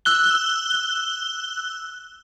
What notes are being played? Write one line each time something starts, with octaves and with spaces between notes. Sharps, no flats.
E6 F#6 G7